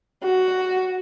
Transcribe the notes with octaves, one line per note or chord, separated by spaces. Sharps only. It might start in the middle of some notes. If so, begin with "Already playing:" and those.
F#4